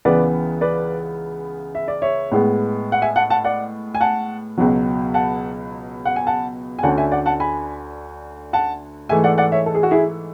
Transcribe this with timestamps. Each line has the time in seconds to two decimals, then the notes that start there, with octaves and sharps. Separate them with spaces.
0.05 C#2 C#3 E3 B3 B4 D5
0.61 B4 D5
1.75 E5
1.88 D5
2.02 C#5 E5
2.32 A2 G#3 B3
2.92 F#5
3.02 E5 G#5
3.16 F#5 A5
3.30 F#5 A5
3.44 D5 F#5
3.95 G#5
4.01 F#5 A5
4.58 C#2 B2 F#3
5.14 F#5 A5
6.05 F#5
6.16 G#5
6.27 F#5 A5
6.79 G#5
6.83 D2 D3 A3 C#4 F#5 A5
6.97 E5 G#5
7.12 D5 F#5
7.26 F#5 A5
7.40 G#5 B5
8.53 F#5 A5
9.09 G#2 E3 A3 E5 G#5
9.24 D5 F#5
9.38 D5 F#5
9.52 C#5 E5
9.66 A4
9.75 G#4
9.83 F#4
9.91 E4 G#4